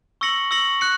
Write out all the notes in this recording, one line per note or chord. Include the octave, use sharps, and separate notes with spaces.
C#6 E6 A#6 C#7 F#7
C#6 E6 A#6 C#7 F#7
F#6 C#7